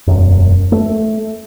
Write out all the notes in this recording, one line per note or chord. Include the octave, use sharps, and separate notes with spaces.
E1 F#2
A3